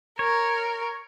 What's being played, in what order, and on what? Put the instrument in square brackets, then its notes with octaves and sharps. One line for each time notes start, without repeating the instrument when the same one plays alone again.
[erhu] A#4 [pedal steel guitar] C#5